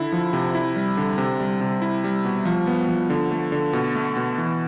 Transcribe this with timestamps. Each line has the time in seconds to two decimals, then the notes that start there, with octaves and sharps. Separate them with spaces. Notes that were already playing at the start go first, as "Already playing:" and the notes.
Already playing: D3 E4
0.12 F3
0.33 C3
0.55 E4
0.76 G3
0.97 D3
1.18 C3
1.40 G3
1.61 C3
1.82 E4
2.04 G3
2.25 B2
2.45 F3
2.67 B3
2.88 F3
3.10 D3
3.31 A3
3.52 D3
3.73 B2
3.95 A3
4.16 B2
4.38 E3